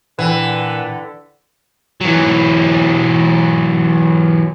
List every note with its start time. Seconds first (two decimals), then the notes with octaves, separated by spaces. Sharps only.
0.19 A#2 D3 E3 B4 F#5 G5
2.01 E3 F#3